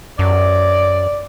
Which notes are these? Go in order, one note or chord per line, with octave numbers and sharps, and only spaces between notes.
F#2 D5